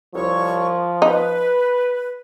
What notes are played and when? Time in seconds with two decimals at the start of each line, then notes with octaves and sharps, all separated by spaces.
0.15 C2 F3 C#5 C#6
1.02 D#4 B4